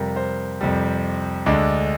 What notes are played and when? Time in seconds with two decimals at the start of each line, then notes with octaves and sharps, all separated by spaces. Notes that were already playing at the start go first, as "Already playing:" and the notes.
Already playing: F2 C3 G3 A#4
0.16 C5
0.61 F2 C3 G3
1.46 D2 D3 G#3 D4 D5